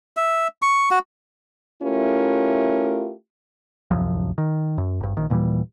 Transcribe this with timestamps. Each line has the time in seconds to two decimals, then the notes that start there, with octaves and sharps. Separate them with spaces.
0.17 E5
0.62 C#6
0.91 F#4
1.83 A3 C#4 E4 F4 G4 A#4
3.91 D1 C2 F#2 F3
4.38 D#3
4.78 F#2
5.00 G#1 G2
5.17 A#1 D#3
5.30 D#2 A#2 E3 G3